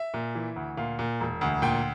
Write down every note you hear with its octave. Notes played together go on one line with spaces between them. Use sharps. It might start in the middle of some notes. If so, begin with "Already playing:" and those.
Already playing: E5
A#2
E3
D2
A#2 F5
A#2
E1
D2
A#2 G5